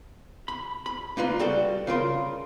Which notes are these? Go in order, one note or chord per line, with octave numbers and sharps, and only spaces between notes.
B5
B5
A#3 D#4 F4 B4
G3 F#4 A4 G5
C#3 F4 A#4 C6